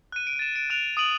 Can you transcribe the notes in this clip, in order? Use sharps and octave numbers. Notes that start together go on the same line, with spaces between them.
F#6 D#7
D7
A6 E7
D7
F#6 D7 F7
D#6 D7 D#7 F#7